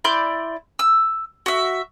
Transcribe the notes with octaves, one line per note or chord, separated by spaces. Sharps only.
E4 D5 C6 G6
E6
F#4 E5